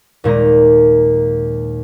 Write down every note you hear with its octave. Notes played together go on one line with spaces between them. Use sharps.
D#2 A#2 G#3 A#5